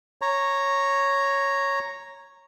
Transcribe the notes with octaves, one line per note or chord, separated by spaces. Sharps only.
C#5 A#5